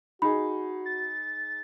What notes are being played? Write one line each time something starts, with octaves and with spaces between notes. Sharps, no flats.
D#4 F#4 G#4 B5
A6